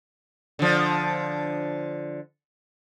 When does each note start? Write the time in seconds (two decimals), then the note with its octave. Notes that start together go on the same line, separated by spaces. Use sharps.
0.59 D3 F3